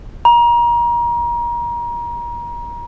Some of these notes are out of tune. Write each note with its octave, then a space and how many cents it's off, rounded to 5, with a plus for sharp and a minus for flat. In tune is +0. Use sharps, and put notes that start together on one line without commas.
A#5 +30